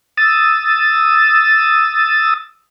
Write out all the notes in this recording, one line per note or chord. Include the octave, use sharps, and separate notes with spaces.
D#6 E6 A6